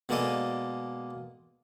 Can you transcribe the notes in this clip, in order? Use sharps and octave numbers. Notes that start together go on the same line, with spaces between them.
B2 G#3 A#3 A4 D5 D#5